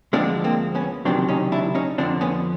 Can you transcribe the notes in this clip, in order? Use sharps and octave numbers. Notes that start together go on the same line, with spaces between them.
D2 D3 F3 G#3 C4 D4
A#3 C4
B3 C#4
C#2 C3 D#3 F#3 C4 D4
C#4 D#4
D4 E4
C#4 D#4
F2 D3 F3 C4 D4
B3 C#4